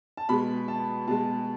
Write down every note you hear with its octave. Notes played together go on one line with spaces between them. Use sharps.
A5
B2 G#3 B5
A5
B2 G#3 A5